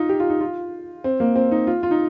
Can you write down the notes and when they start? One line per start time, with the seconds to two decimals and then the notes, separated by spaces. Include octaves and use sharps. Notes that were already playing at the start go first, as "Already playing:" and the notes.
Already playing: D#4 F4
0.09 G4
0.20 F4
0.30 D#4
0.41 F4
1.04 C4
1.20 A#3
1.36 C4
1.51 D#4
1.67 F4
1.83 F4
1.91 D#4